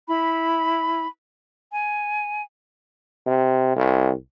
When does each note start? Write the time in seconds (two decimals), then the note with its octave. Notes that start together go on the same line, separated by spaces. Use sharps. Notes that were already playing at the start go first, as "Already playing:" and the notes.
0.08 E4 B5
1.71 G#5
3.26 C3
3.76 C2